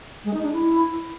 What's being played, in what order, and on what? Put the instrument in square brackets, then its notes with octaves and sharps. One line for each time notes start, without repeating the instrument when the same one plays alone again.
[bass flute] G#3
D#4
D4
E4